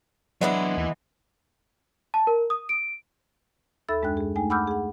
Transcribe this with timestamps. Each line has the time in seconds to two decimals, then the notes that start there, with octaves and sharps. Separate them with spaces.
0.41 E3 F#3 G#3 B3 D4 E4
0.77 D#2 E3
2.14 A5
2.27 A#4
2.50 D#6
2.69 D7
3.89 D#2 A4 E5 B5 E6 A6
4.02 F#2 G#3 D4 G5 F#6
4.17 G#3 G#4
4.36 A3 D#4 G5 G#5
4.50 F#5 B5 D6 E6 F6 G6
4.68 G#4 F#5